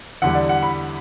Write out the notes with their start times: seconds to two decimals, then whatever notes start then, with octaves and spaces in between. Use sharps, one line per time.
0.22 E2 D3 G3 F#5
0.35 D5
0.49 F#5
0.63 B5